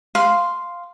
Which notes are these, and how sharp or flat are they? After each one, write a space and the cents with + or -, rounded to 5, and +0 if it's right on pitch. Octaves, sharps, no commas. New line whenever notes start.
F5 +0 C6 -5